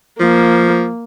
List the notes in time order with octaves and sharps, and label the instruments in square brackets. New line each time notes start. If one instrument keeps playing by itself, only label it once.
[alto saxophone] F3 [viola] A#3